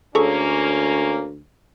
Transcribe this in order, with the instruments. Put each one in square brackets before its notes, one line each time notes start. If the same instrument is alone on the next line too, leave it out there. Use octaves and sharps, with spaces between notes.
[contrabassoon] D2 [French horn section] A#3 C#4 [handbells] G#4 A4 C#6